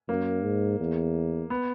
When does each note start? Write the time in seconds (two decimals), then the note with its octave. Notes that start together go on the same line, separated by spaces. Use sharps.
0.09 F#2 A#3
0.45 G#2
0.80 E2
1.50 B3